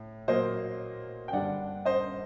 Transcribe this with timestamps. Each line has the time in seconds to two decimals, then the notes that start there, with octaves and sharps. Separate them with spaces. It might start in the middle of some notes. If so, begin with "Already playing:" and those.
Already playing: A2
0.28 A#2 F#3 A#3 C5 D#5
1.28 G5
1.33 G2 D3 G3 D4 D5 F#5
1.85 C5 D#5